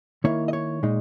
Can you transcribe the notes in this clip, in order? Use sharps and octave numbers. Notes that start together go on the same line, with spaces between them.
D#3 A#3 E4 C#5
D#5
C#5
A#2 G#3 D#4